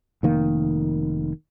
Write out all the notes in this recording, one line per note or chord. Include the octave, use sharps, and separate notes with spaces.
F1 D#3 A#3